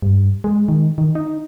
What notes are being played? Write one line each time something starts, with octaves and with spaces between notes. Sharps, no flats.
G2
G#3
D#3
D#3
D#4